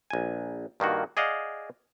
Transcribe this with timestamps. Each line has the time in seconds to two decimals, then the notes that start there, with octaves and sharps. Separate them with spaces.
0.10 A#1 G#5
0.80 G2 D#3 A#3 F#4
1.17 G#4 D5 D#5 F5 F#5